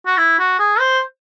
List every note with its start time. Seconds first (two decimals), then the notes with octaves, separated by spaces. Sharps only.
0.06 F#4
0.17 E4
0.39 F#4
0.59 G#4
0.80 C5